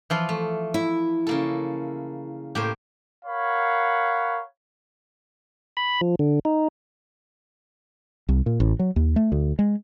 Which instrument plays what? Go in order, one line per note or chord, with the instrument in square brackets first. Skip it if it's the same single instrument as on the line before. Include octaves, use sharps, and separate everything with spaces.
[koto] E3 F3 F4
[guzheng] A3
[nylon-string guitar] E4
[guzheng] C#3 A#3 A4
[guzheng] A2 A#3 C5 [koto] G4
[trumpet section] A#4 C#5 F5 F#5 B5
[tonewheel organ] B5
F3
D3
D#4
[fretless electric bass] C2
A#2
A1
F#3
D#2
A3
D2
G#3